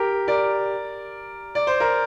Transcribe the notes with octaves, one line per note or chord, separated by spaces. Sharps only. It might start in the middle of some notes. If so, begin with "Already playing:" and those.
Already playing: G4 A#4
A#4 D5
D5
C5
A#4